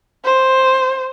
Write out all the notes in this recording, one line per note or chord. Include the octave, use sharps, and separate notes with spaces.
C5